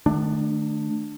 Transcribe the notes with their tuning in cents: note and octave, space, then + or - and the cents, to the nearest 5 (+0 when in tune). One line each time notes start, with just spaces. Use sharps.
D#3 -30 A3 +0 D4 +15